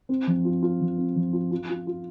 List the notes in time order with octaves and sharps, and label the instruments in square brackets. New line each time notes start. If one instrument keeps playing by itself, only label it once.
[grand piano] C4
F3
F4
F4
F3
C4
F3
F4
F4
F4
F4